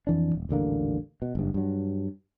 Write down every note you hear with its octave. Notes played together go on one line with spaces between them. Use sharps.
F2 E3 D4
D#1
D#1 A1 D3 A#3
B2
F#1 G2
G2 F#3